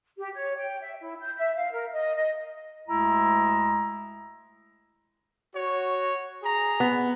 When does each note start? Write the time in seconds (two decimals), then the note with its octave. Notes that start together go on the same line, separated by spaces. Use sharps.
0.18 G4
0.34 C#5
0.57 G5
0.81 E5
1.01 E4
1.21 G6
1.37 E5
1.55 F5
1.72 A#4
1.92 D#5
2.15 D#5
2.88 D2 G#3 E4 A#5
5.53 F#4 C#5
6.42 G#4 A#5
6.80 B3